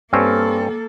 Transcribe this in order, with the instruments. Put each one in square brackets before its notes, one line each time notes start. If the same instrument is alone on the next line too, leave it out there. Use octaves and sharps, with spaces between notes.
[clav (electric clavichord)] G2 C4 C#4 [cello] A#3 A4